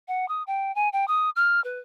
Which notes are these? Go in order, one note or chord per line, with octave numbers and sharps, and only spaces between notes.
F#5
D#6
G5
G#5
G5
D#6
F6
B4